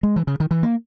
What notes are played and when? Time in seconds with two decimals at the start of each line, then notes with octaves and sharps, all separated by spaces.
0.03 G#3
0.16 E3
0.27 C#3
0.40 D#3
0.51 E3
0.63 A#3